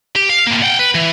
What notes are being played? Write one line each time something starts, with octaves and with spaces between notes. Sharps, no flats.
G4
F5
A2 A#3
F#5 G5
B4
E3